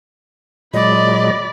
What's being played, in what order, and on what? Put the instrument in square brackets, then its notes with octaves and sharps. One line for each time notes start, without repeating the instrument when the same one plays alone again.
[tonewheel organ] A#2 F#3 G#3 [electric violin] D5 B5 [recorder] D#5